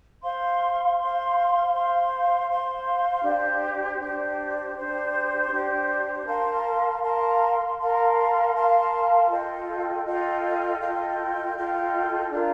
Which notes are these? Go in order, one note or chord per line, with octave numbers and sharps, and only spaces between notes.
C5 F5 C6
C5 F5 C6
C5 F5 C6
C5 F5 C6
D4 G4 C5
D4 G4 C5
D4 G4 C5
D4 G4 C5
A#4 F5 A5 C6
A#4 F5 A5 C6
A#4 F5 A5 C6
A#4 F5 A5 C6
F4 A4 D#5 G5
F4 A4 D#5 G5
F4 A4 D#5 G5
F4 A4 D#5 G5
D4 F4 A#4